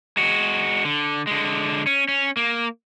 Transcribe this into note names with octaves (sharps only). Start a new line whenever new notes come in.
G#3 F#4
D3
D3 G#3
C#4
C#4
A#3